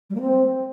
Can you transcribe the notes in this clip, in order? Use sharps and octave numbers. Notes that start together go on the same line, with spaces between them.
G3
A#3
C4